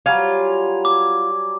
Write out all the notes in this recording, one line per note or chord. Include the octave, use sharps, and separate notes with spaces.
F#3 G3 F4 G#5
D6